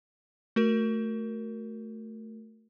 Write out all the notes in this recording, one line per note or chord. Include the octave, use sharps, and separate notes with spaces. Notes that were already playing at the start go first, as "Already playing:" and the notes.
A3 F#4 A#4